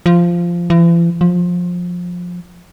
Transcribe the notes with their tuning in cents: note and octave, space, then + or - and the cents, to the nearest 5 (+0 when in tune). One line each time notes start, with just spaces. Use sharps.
F3 -10
E3 +45
F3 +20